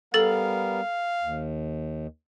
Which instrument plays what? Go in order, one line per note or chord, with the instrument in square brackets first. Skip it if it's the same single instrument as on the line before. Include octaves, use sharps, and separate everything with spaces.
[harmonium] G3 B3 A#4 [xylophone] A4 A6 [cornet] F5
[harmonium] D#2